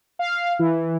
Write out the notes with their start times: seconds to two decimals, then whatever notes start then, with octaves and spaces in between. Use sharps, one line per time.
0.19 F5
0.59 E3